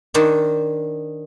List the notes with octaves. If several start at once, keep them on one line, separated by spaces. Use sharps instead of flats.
D#3 D4 C5 C#5